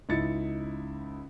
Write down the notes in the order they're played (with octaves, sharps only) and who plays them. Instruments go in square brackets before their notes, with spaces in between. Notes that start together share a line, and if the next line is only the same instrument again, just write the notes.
[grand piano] C#2 D#4 E4 A6 C#7